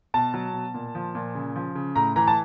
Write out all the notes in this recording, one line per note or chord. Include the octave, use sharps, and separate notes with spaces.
B2 A5
F#3
B2
A#2
F3
A#2
C#3
F3
C#3
A2 A#5
E3 A#5
A5